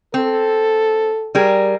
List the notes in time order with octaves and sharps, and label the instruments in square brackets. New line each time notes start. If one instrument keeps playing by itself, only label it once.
[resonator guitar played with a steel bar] C4 [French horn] A4
[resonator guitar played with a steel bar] G3 G#4 A#4